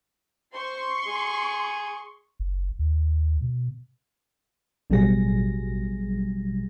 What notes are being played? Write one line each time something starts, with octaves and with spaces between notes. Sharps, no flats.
C5 C6 C#6
G#4
F#1
D#2
B2
A1 B2 F#3 G3 G#4 A#6